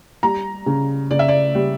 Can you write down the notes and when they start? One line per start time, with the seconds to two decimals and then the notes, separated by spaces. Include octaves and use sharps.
0.23 G3 A#5
0.66 C#3
1.10 C#3 D5
1.19 E5
1.28 D5
1.55 G3